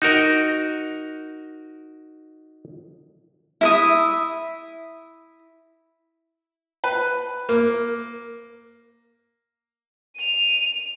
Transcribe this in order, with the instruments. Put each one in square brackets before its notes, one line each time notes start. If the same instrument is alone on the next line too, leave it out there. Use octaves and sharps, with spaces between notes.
[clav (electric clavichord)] D#4 F#4 A#4 D#5
[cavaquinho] E4 E5 D#6
[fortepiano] B4
A#3
[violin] D#7 F7